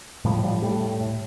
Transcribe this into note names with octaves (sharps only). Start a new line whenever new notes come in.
A2 F3 G3
A2 F3 G3
A2 G3 A3
A2
A2